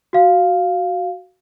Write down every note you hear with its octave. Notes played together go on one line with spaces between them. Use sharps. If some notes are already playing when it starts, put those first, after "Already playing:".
F#4 F5